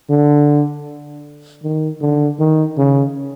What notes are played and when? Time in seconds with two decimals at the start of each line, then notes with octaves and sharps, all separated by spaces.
0.10 D3
1.63 D#3
2.01 D3
2.39 D#3
2.78 C#3